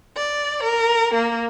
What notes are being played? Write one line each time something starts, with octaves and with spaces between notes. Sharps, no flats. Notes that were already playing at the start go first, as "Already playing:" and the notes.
D5
A#4
A#3